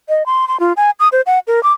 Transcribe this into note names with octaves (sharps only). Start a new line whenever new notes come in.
D#5
C6
C6
F4
G#5
D#6
C5
F#5
A#4
D6